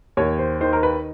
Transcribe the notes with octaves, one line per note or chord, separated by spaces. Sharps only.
D#2 C#5
C5
D#3 C5
A#4
B4